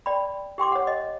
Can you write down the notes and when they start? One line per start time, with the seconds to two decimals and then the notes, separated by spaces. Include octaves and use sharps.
0.06 D5 G5 B5
0.58 G4 G5 C6 D6
0.72 C#5 F#5
0.87 D#5